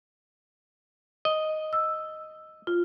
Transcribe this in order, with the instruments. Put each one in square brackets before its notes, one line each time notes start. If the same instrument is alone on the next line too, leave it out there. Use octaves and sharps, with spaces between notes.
[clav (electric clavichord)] D#5
[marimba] E6
F4